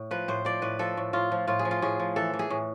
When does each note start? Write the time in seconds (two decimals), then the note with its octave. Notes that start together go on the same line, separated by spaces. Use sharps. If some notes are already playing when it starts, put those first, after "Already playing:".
Already playing: A2
0.11 F3 B4
0.28 A2 C5
0.45 F3 D5
0.62 A2 B4
0.79 F3 A4
0.97 A2
1.13 A2 F4
1.32 F3
1.48 A2 F4
1.59 G#4
1.65 F3
1.71 F4
1.82 A2 G#4
2.00 F3
2.16 E3 A4
2.34 E3
2.39 G#4
2.50 A2